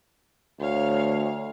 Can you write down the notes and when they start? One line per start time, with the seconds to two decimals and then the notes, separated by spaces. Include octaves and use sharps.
0.60 D2 C#5 F5